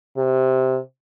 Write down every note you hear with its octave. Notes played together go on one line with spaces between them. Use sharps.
C3